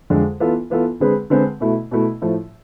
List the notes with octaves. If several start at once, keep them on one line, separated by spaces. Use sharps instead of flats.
F2 D3 G#3
E3 B3 F4 A4
E3 B3 F4 A4
D3 G#3 C4 G#4 B4
D3 G#3 C4 G#4 B4
B2 A3 E4
B2 A3 E4
A2 F3 A3